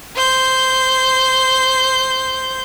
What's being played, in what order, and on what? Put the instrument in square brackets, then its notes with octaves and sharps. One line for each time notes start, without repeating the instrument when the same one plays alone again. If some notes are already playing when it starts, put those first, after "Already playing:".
[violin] C5 G6